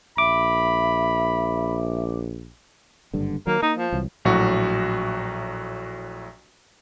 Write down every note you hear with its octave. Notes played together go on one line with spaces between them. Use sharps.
A#1 E5 B5 D6
F#1 G2 D3
D#3 F#3 A#3
A#3 D#4
F3
C2 E3 F#3
A#1 A2 F#3 F#4